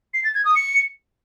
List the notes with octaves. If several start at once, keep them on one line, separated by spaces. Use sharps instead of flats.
C7
A6
G#6
D#6
C#7